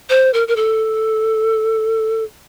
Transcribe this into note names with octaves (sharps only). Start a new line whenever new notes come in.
C5
A#4
A#4
A4